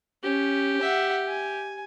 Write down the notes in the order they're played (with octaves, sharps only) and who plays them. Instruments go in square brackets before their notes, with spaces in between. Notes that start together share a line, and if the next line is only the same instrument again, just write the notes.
[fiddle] C#4 [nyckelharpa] G4
[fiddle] E5 F#5
G#5